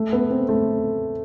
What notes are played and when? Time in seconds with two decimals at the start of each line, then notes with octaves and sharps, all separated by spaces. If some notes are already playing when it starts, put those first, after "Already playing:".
Already playing: A3
0.12 B3
0.30 C4
0.49 A3